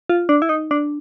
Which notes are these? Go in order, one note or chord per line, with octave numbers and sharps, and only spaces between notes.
F4
D4
E4
D#4
D4